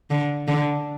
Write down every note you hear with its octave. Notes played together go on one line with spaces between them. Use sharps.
D3
D3